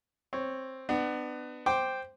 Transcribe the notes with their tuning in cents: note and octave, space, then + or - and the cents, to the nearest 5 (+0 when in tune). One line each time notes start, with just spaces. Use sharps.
C4 +10 C#5 +0
B3 +20 D4 +30
C5 +0 G5 +0 D6 +0